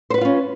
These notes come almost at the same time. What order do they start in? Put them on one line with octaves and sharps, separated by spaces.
C5 B4 F#4 F4 C#4